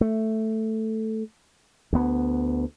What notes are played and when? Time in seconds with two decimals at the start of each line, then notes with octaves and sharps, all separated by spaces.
0.01 A3
1.93 D2 B3